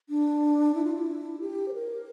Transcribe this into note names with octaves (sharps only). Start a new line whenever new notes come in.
D4
E4
F4
E4
G4
C5
A#4